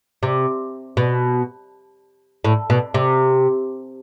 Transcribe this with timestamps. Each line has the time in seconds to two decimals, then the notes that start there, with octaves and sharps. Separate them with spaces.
0.23 C3
0.97 B2
2.45 A2
2.70 B2
2.94 C3